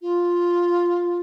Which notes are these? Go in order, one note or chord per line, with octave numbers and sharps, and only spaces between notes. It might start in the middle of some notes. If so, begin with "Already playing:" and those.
F4